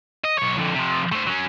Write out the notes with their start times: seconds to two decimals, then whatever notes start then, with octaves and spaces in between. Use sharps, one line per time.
0.24 D#5
0.39 B1 C#5
0.59 F2 D3
0.75 C3 F3
1.12 A3 C5
1.27 F#3 C#4